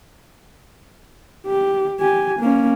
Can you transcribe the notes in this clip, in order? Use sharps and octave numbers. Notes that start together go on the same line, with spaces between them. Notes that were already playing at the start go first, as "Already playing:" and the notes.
G4
G4 G#5
A#3 C#4